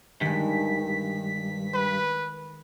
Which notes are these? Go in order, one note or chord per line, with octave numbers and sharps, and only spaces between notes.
G2 D#3 G#3 B6
B4